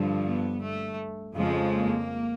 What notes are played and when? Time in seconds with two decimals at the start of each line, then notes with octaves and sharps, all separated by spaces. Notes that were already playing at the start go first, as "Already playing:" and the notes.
Already playing: G2 D3 F3
0.25 B3
0.62 A3
1.36 F2 C#3 F3 G#3
1.72 A#3